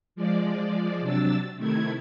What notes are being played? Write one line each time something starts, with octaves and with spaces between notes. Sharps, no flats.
F3 G#3 D5
C3 F#3 D4 E6 A6
C3 D#3 A3 E4 G#6